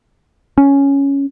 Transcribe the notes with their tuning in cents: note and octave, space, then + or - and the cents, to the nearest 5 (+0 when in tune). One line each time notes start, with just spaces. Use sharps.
C#4 +5